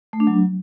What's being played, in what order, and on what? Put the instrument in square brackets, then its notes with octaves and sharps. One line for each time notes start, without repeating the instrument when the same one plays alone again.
[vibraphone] A3
D4
F#3